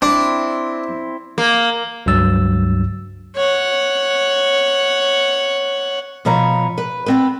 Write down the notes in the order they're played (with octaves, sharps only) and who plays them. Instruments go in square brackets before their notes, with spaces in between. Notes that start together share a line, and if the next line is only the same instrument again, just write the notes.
[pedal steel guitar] C4 E4 [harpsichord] D4
[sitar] A#3
[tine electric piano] C#2 G2 F#3 E6 A6
[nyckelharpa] C#5 F#5
[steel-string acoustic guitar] B2 F3 B4 C#5 A#5
B4
B3 C4 B4